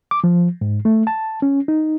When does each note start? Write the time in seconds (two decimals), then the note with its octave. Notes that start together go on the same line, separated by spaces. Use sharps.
0.11 D6
0.24 F3
0.61 G#2
0.85 A3
1.07 A5
1.42 C#4
1.68 D#4